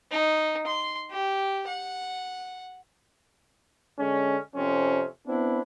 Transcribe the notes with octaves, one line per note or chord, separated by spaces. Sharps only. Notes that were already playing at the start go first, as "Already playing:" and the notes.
D#4
C6
G4
F#5
D3 G#3 C#4
F2 C3 C4 C#4
B3 C4 D4 E4